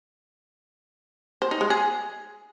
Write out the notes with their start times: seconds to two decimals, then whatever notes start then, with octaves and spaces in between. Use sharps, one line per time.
1.42 C5
1.51 D#4
1.61 G#3
1.70 G#4